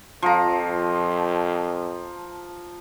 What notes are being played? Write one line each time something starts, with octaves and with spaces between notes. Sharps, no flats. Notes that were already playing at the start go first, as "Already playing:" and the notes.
F2 F3 A#5